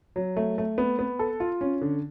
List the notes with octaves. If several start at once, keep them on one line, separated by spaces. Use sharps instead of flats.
F#3
A3
A3
B3
B3
A4
F4
C#4
D3